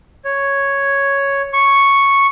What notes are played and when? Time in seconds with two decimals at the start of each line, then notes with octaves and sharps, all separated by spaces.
0.25 C#5
1.53 C#6